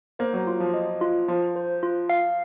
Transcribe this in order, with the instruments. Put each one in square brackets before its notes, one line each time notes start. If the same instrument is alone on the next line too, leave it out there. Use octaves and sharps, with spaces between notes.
[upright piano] A#3 [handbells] C5
[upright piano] F#3
[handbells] F4
[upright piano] F3
[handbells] D#5
F4
[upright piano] F3 [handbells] F4
[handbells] C5
F4
F5